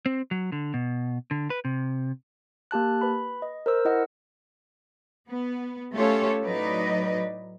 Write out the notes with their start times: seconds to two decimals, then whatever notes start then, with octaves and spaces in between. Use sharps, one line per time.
0.06 C4
0.31 F#3
0.52 D3
0.74 B2
1.31 D3
1.50 B4
1.65 C3
2.71 A#3 G4 A5 F#6
3.01 B4 B5
3.42 D#5
3.66 A#4 C5 E6
3.85 E4 D#5 F#5
5.28 B3
5.92 A3 C#4 F4 G4 A4 C#5
6.43 A2 F#3 D#4 B4 D5 D#5